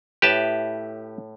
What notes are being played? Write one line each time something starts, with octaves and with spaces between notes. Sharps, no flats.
A2 G4 B4 A5